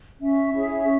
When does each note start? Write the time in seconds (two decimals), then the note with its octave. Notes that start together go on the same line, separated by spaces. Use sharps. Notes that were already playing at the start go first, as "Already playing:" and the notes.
0.22 C#4 E5
0.53 E4 G#4 C#5
0.83 C#4